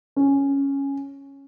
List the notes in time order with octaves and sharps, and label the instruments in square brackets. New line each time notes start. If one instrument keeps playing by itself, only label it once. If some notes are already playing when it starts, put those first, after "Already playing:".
[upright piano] C#4